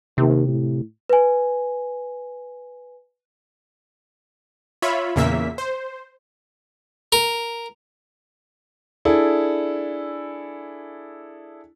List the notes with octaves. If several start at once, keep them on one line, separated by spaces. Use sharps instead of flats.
D#2 C3
A2
B4 G#5
F4 C#5 E5 B5
E2 A#2 C#3 A#3 E5 B6
C5
A#4
D4 E4 G#4 A4